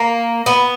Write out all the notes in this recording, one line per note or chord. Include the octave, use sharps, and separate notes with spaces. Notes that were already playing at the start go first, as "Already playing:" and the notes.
Already playing: A#3
B3